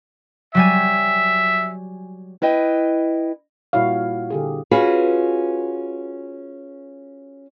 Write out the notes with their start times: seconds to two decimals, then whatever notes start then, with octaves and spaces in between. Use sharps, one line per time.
0.55 F#3 G3 E5 G#5
2.42 E4 B4 D#5 G5
3.73 A#2 G3 E4 F#4 C#5 F5
4.30 D3 G4 G#4
4.71 C#4 F4 F#4 G#4 B4